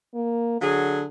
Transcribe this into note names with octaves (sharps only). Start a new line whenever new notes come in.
A#3
D3 F#3 G#4